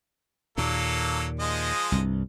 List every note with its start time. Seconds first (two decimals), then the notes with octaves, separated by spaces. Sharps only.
0.58 D#2 A#2 F#3 A#3 A4
1.40 F3 G#3 D#5
1.92 C2 G2